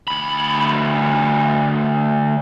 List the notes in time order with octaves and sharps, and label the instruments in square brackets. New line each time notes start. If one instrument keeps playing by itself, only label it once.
[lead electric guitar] D2 B5